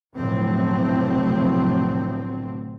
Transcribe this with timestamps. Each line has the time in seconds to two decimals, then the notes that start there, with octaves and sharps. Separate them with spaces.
0.16 F1 B1 A2 D3 F#3 C4